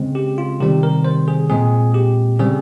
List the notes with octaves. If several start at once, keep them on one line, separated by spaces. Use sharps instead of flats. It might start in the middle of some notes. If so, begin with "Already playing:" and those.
Already playing: C#3 G#3 C4
G4
F4
C3 D#3 G3 C4 G4
A#4
C5
G#4
A#2 G#3 C4 G#4
G4
C#3 G3 C4 G#4